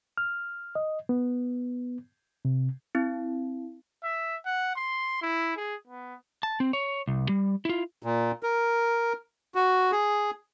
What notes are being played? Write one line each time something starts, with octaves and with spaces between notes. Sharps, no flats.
F6
D#5
B3
C3
C4 E4
E5
F#5
C6
E4
G#4
B3
A5
C4
C#5
C2
G3
E4 F4
A#2
A#4
F#4
G#4